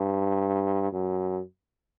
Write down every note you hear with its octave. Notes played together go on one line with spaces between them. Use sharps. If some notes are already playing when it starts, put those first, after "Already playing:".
Already playing: G2
F#2